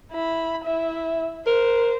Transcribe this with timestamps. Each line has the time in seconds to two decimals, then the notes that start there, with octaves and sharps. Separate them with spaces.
0.12 E4 B5
0.64 E4 E5
1.47 A#4 C5